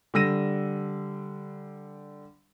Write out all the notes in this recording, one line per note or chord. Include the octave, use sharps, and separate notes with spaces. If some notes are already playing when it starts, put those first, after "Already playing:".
D3 G3 E6 A#6 D#7